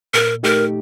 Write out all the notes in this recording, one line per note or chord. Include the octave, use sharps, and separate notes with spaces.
A#2 A#4
A3 D#4 G4 A#4